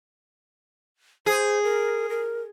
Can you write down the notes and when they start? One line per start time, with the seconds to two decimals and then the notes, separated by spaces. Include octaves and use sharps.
1.26 G#4 C5
1.63 A#4
2.09 A#4